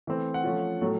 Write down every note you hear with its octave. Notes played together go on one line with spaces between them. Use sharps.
E3 A3 C4
F#5
F3 A3 C#4 F4
A2 F#3 A3